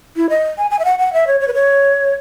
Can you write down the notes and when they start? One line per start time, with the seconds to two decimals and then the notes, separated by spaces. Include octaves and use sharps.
0.16 E4
0.29 D#5
0.58 G#5
0.71 G#5
0.79 E5
0.85 F#5
0.99 F#5
1.13 E5
1.27 C#5
1.41 C#5
1.48 B4
1.54 C#5